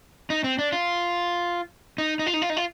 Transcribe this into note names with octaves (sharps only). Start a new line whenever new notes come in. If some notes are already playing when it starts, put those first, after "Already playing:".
D#4
C4
D4
F4
D#4
D#4
F4
D#4
F4
D#4
F4